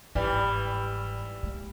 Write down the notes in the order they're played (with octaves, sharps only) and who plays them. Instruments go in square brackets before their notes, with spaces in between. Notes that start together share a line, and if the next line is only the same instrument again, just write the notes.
[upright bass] G1 G#2 [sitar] E3 G3
[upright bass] G#3 A#3